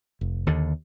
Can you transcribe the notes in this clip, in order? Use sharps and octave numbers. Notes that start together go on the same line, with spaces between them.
F1
D#2 D3